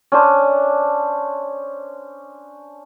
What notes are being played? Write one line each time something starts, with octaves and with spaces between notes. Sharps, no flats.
C#4 D4 C5